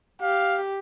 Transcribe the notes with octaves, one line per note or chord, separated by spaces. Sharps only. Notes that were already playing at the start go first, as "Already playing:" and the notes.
G4 F5